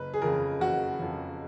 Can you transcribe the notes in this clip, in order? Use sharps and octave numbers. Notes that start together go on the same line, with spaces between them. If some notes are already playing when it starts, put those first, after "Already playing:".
Already playing: F#1 B4
G#4
F2 C#3 A#4
F#1 F#4
F2 C#3